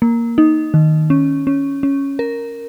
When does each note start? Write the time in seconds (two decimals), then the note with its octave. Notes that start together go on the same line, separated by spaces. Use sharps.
0.02 A#3
0.38 D#4
0.74 D#3
1.10 C#4
1.47 C#4
1.83 C#4
2.19 A#4